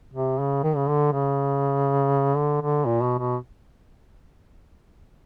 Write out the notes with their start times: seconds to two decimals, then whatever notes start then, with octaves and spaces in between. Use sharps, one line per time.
0.14 C3
0.39 C#3
0.64 D#3
0.77 C#3
0.88 D3
1.13 C#3
2.37 D3
2.61 D3
2.86 A#2
3.03 B2
3.19 B2